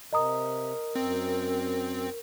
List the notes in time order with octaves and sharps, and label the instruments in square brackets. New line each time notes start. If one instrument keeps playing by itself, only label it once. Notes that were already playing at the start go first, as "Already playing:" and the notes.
[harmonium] C3 [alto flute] A#4 [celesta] D#5 A#5 D#6
[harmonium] F#2 [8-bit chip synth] C4